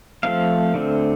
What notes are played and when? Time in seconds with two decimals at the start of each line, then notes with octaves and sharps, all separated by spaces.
0.23 F3 A3 C4 F5
0.74 D3 A3 C4